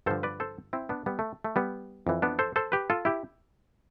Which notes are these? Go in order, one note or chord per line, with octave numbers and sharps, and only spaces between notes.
G2 D3 F3 A4 C5
B4 D5
A4 C5
C4 E4
B3 D4
G3 B3
A3
A3
G3 B3
F2 E3
B3 D4
A4 C5
A4 C5
G4 B4
F4 A4
E4 G4